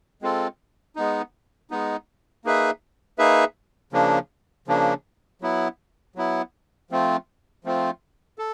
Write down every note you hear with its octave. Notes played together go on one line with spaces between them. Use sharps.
G#3 C4 F4 A4
G#3 B3 D#4
G#3 B3 D#4
A#3 D#4 G#4 B4 E5
A#3 D#4 G#4 B4 E5
C#3 F3 A#3 D4
C#3 F3 A#3 D4
F#3 B3 E4
F#3 B3 E4
F3 A3 C4 F4
F3 A3 C4 F4
A4